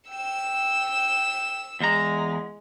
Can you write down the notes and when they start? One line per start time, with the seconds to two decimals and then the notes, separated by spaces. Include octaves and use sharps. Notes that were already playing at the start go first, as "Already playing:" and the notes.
0.11 G5 E6 E7
1.80 E2 G#3 A#5